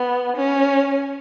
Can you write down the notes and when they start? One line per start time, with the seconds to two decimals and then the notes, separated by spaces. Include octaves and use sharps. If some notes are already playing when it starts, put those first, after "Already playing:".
Already playing: B3
0.37 C#4